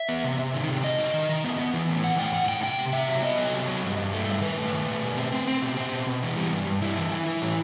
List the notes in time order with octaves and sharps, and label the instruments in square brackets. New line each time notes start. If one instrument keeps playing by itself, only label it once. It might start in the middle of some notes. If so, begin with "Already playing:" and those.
Already playing: [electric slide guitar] E5
B3
C3
C3
D#3
C3
F#3 D#5
C3
D#3
D#3
B3
B3
E3
A2
E3 F#5
A2 G5
A2 F#5
A2 G5
C3 G5
C3
C3 E5
F#3
B3 D#5
F#3
C3
F#3
G2
G2
A3
G2
D#3 B4
A3
D#3
A3
B2
C4
C4
C4
B2
C4
B2
B2
E3
G3
G2
G2
G2 E4
E3
E3
E3
A2